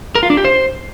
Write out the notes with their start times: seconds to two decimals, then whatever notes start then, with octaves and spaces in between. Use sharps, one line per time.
0.15 A#4
0.23 F4
0.30 D4
0.37 G4
0.45 C5